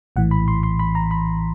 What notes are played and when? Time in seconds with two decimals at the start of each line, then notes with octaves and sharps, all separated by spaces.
0.16 A#1 A2 E3 F#5
0.31 B5
0.48 C6
0.63 C6
0.79 B5
0.95 A#5
1.11 B5